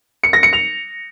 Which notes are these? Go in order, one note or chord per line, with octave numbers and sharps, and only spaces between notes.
C#7
A#6
C#7
F7